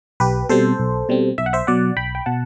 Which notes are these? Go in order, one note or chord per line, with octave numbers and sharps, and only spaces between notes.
B1 G4 B4
B2 G3 C4 A4 C5
B1
B2 G3 C4
B1 E5
F#5
C5 E5
B2 F#3 D5 F#5
B1 G5 B5
G5
B2 F#5 A5